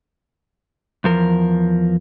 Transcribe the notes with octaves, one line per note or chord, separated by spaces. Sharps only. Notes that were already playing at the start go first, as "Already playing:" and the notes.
E2 F3 A#4